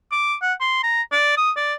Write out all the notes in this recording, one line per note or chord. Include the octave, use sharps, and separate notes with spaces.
D6
F#5
C6
A#5
D5
D#6
D5